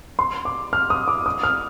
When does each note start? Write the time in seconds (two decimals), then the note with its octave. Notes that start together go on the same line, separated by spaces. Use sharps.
0.19 C6
0.45 D6
0.73 F6
0.90 D#6
1.08 D6
1.26 D#6
1.43 F6